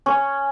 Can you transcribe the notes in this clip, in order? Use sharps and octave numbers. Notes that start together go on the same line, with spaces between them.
C#4